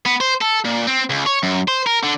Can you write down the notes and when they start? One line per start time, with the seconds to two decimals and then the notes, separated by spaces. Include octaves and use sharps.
0.06 B3
0.21 C5
0.41 A4
0.65 A#2
0.87 C4
1.10 C#2
1.26 C#5
1.43 F#2
1.68 C5
1.87 A#4
2.03 D3